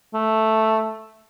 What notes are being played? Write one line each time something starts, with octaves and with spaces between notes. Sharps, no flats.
A3